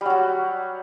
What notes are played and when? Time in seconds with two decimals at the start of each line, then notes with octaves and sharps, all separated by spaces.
0.01 G3
0.05 F#3
0.10 F#4